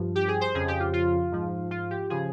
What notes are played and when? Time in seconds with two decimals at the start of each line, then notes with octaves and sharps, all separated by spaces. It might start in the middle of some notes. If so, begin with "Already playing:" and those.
Already playing: G2 F3
0.15 G4
0.28 G#4
0.41 C5
0.55 F2 C#3 F3 G#4
0.68 G4
0.80 F4
0.93 F4
1.32 G#2 F3
1.71 F4
1.91 G4
2.10 C#3 F3 G#4